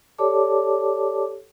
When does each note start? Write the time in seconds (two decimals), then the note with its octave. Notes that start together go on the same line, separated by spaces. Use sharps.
0.18 G4 A4 C#5 D5 A5 D6